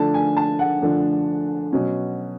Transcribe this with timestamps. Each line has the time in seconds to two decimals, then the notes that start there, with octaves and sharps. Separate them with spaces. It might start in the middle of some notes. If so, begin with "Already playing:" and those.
Already playing: D3 F3 A3 D4 A5
0.14 G#5
0.37 A5
0.59 F#5
0.82 D3 F3 A3 D4
1.73 B2 F#3 C#4